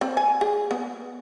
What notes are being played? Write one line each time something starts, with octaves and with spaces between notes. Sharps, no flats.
C4
G#5
G#4
B3